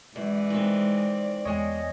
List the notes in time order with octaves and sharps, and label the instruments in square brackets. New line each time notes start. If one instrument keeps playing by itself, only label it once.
[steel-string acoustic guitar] F#2 [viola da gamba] E3 G#3 [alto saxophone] D5
[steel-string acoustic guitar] D#3 C4
[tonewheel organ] E2 C#5 D#5 [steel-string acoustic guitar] G#3 G5